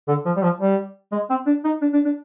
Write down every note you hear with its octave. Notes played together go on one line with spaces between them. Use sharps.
D3
F3
G3
F3
G3
G#3
C4
D4
D#4
D4
D4
D4